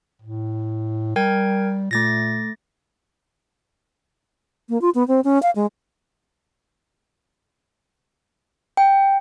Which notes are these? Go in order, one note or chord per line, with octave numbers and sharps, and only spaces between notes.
A2
G3 A#4 G5 G#6
A#2 A3 A6 A#6
A#3
F4
B3
C4
C#4
F5
G#3
G5